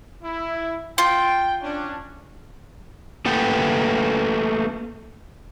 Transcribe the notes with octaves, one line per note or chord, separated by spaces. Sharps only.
E4
F4 G5
C#4 D4
A3 A#3 A4 B4 F#5 G5